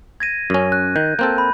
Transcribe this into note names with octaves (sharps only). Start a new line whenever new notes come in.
G#6 A#6 D#7
F#2 C#4
F#6
D#3 G6
A#3 C4 A4 G6
B5